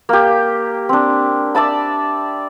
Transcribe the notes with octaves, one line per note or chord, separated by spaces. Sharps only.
A#3 G4
C4 D4
D5 E5 A5 B5